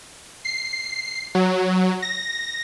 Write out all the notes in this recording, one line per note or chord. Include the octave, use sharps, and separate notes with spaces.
C7
F#3
A#6